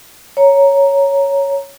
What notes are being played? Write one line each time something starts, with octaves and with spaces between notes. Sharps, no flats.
C#5 A#5